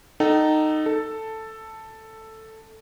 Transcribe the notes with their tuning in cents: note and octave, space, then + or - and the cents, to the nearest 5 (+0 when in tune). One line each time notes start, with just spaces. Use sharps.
D#4 -10 A4 +0 G5 -45
A4 +5 A5 +5